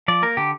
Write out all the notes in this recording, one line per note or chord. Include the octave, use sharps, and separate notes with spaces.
F3 D5
A#3 A#4
D3 G4